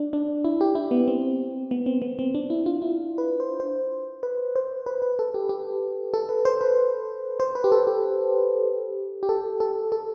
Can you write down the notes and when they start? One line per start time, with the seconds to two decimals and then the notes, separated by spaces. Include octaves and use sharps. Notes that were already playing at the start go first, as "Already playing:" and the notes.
Already playing: D4
0.13 D4
0.45 E4
0.61 G4
0.75 E4
0.91 B3
1.08 C4
1.71 B3
1.86 C4
2.02 B3
2.19 C4
2.35 D4
2.50 E4
2.66 F4
2.82 E4
3.18 B4
3.40 C5
3.60 C5
4.23 B4
4.56 C5
4.86 B4
5.02 B4
5.19 A4
5.34 G4
5.49 G4
6.14 A4
6.29 B4
6.45 C5
6.61 B4
7.40 C5
7.55 B4
7.64 G4
7.72 A4
7.87 G4
9.23 G4
9.29 A4
9.60 A4
9.92 A4